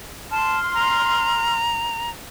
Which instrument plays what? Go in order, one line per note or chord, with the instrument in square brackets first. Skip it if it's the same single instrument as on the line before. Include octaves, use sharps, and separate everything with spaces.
[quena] A5 [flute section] C6 F6
[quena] A#5